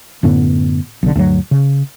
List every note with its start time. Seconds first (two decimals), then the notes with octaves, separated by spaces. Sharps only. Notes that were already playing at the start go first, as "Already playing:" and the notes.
0.23 F#2 A2 D3 B3
1.03 B1 D3
1.16 D2 G2 F#3
1.51 C#3